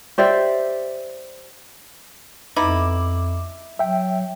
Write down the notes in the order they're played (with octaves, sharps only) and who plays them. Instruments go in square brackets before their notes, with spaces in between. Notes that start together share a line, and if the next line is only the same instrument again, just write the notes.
[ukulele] G4 C5 D5 E5
[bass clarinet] F2 [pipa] B3 D#4 E4 [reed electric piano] D6
[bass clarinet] F#3 [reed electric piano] E5 G5